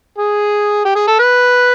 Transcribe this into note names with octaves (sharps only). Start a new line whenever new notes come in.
G#4
G4
G#4
A4
B4